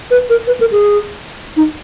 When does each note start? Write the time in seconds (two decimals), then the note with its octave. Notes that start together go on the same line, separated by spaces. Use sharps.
0.11 B4
0.30 A#4
0.47 B4
0.60 A#4
0.72 G#4
1.57 D#4